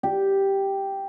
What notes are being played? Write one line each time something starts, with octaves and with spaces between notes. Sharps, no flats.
G4